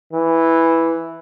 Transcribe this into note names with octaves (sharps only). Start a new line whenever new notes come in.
E3